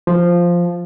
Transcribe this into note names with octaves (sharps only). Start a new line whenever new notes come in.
F3